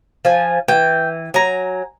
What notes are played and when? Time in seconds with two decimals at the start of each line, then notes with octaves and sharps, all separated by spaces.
0.25 F3 G#5
0.68 E3 G5
1.34 F#3 G#5 A#5